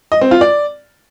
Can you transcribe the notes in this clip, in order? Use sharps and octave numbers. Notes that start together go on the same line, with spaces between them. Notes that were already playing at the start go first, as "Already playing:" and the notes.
D#5
C4
F4
D5